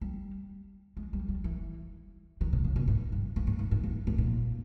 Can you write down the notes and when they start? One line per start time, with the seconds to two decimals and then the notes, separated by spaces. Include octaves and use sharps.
0.01 G3
0.97 G#3
1.13 G3
1.28 G3
1.44 E3
2.41 D#3
2.53 B2
2.64 C#3
2.76 B2
2.88 G#2
3.12 G2
3.36 G2
3.47 G#2
3.59 G#2
3.71 G#2
3.84 G2
4.07 G#2
4.18 A#2